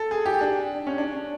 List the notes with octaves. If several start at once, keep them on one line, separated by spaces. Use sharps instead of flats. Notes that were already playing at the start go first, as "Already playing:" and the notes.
Already playing: A4
G#4
G4
D4
C#4
D4